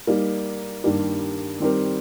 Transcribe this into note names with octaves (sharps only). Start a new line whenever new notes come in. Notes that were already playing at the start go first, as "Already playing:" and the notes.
G3 A#3 D#4
G2 D#3 G3 A#3
D#3 G3 C4 G4 A#4